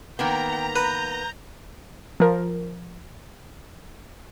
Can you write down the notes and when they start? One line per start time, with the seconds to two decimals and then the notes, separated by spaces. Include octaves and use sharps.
0.19 D#3 A#3 B3 G5 A#5
0.76 B4 G6
2.20 F3 A#4